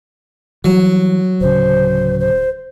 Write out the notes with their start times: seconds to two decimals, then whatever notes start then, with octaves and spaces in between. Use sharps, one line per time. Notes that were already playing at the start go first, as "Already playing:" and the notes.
0.64 E3 F#3 G3
1.41 D1 C#3 C5
2.20 C5